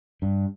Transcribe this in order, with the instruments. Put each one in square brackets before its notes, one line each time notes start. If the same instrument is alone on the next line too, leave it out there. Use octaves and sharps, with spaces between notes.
[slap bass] G2